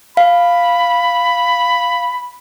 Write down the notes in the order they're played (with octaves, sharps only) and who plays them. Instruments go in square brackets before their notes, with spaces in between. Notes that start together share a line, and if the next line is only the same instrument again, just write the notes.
[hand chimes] F5 [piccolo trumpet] B5